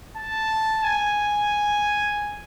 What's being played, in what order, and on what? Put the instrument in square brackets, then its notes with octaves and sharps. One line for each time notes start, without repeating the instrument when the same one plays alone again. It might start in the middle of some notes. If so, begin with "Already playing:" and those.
[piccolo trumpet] A5
G#5